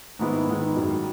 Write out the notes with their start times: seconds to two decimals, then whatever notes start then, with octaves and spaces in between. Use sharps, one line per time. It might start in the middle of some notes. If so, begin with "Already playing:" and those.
0.19 G#2 D#3 G#3 B3 E4
0.47 G#2 D#3 G#3 B3 E4
0.76 F#2 D#3 G3